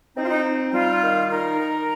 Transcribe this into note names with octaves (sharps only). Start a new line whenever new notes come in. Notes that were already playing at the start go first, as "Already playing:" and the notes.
C4 D#4
F4
D#4
D#4
G3 F4
D#3
D#4 A#4
D#3